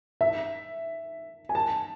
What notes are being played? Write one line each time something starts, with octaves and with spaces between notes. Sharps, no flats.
E5
G#5
A5